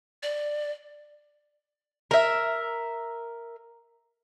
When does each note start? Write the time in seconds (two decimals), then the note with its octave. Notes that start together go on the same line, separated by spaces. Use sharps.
0.23 D5
2.11 A#4 E5